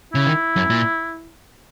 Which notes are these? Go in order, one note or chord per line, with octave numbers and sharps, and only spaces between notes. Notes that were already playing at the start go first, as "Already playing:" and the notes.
C#3 E4
D#3
F#2
A#2